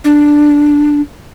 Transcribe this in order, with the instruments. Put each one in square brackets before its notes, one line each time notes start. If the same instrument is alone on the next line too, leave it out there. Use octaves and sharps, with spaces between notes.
[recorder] D4